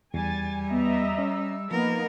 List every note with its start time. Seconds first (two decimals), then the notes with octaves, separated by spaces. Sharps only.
0.14 E2 G3 G#5 A6
0.70 B3 D#5 E5 A#5
1.18 C#4 E6
1.71 F3 A#3 B3 D#4 A#4